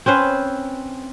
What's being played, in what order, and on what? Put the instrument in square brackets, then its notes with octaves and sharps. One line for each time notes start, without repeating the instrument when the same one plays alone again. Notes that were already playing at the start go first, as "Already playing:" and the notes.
[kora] C4 C#4 B4 C5